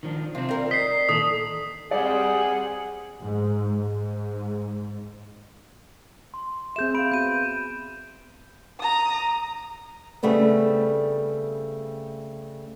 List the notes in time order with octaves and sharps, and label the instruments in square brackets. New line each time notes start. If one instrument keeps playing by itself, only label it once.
[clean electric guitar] D#3 F3 D4
[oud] C3 [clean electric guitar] C4 F4
[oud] G3 A#4
[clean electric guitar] D#5 [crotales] B6 C7
[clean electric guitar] A#2 D#3 E3 [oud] A4 [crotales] D#6 F#7
[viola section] G3 C4 [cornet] G#4 [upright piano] D5 [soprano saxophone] F#5
[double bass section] G#2
G#2
[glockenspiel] C6
[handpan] C4 G#4 E5 [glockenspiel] G6 E7
[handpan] G#4 F5 [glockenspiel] B5 D7
[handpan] B3 F#4 [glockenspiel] G6 D#7
[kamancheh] A#5 D#6
[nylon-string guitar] C#3 G3 A3 B3 C4